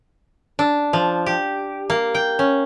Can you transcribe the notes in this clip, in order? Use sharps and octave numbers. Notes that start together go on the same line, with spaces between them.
D4
F3
G4
A#3
G5
C#4